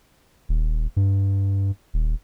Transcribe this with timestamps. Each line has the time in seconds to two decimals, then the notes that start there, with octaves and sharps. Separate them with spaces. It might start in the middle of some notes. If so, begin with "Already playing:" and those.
0.49 D#1
0.96 G2
1.94 D#1